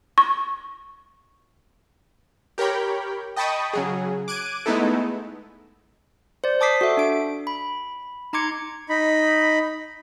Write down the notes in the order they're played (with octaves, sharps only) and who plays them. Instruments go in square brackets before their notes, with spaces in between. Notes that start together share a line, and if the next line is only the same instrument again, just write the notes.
[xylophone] C#6
[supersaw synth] G4 A#4 C#5 G5 B5
D#5 G5 A5 B5 C#6 D#6
C#3 F#3 G#4
D6 F#6 G#6 D7 D#7
G#3 A3 B3 D#4 E4 A4
[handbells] C5 D5
D5 A5 D6 D#6 B6 C7
F#4 A4 E5
D4 D7
B5
D#4 A#5 C6 D6 G#6 C#7
[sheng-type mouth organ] D#4 B5